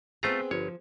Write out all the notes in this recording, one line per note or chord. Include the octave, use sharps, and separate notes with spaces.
A3 B3 C4 F4 G#4 A#5
G1 F3 C#5